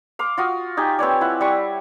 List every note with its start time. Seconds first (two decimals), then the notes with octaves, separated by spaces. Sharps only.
0.19 F5 C6 D6
0.38 F4 F#4 D#6
0.77 D#4 G4 G#5
0.99 C4 B4 C#5 D5
1.21 E4 F#5
1.41 G3 C#6